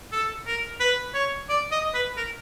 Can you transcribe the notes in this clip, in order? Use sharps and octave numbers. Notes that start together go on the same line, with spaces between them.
A4
A#4
B4
C#5
D5
D#5
B4
A#4